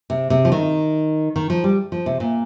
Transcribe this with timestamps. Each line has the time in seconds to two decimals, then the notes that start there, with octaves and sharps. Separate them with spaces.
0.10 C3
0.30 C3
0.45 F3
0.52 D#3
1.36 D#3
1.50 F3
1.64 G3
1.92 F3
2.06 C3
2.20 A#2